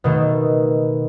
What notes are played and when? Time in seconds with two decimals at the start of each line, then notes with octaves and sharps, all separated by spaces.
0.04 B2 D#3 A3